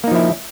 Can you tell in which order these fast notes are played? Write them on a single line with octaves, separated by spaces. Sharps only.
A#3 D#4 F3 E4